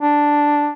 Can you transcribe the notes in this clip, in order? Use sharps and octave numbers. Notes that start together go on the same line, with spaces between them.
D4